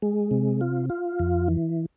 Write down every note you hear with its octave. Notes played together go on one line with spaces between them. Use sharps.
G#3
C3
F4
F4
F2
E3